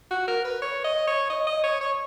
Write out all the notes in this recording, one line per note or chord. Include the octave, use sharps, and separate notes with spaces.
F#4
A#4
B4
C#5
D#5
C#5
D#5
D#5
C#5
C#5